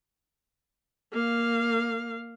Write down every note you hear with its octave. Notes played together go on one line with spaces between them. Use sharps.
A#3 F5